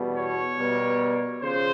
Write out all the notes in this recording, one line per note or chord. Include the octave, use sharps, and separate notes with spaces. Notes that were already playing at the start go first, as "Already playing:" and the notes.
Already playing: E2 B2 G3
C#5
B2 G3 A#3
C#3 F3 C5